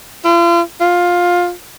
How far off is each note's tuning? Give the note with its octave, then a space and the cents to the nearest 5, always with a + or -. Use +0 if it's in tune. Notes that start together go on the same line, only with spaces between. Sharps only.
F4 -40
F4 +15